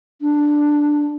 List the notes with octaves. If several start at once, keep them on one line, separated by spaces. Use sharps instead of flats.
D4